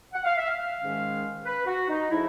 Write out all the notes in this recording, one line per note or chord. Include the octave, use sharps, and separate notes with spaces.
F#5
F5
E5
F5
G#2 D#3 G#3 C#4
B4
F#4
D#4
C#3 F3 A3 E4